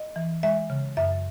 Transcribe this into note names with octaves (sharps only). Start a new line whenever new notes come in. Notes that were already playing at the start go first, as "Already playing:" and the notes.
Already playing: D#5
E3
G#3 E5
C#3
F#2 E5